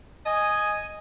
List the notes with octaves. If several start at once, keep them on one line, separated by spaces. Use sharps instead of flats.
D#5 G#5